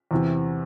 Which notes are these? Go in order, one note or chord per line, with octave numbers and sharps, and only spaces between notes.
E2 C3 E3